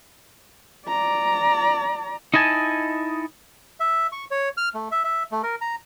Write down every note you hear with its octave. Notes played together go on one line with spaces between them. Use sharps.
D5 A#5
D#4 E4 D#5 G#5 A5
E5
C#6
C#5
F6
A3
E5
E5
A3
A#4
A#5